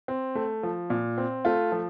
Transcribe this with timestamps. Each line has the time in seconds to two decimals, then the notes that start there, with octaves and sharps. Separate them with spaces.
0.08 C4
0.35 A3
0.63 F3
0.90 A#2
1.18 C4
1.45 A3 F4
1.72 F3